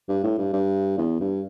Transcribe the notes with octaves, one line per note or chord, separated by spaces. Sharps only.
G2
A2
G2
G2
E2
G2